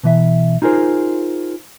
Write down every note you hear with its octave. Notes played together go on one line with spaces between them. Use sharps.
B2 E3 E5
D#4 F4 G#4 A#4 C5